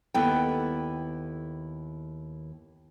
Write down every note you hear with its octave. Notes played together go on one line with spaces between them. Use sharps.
D#2 B3 E4 A4 G5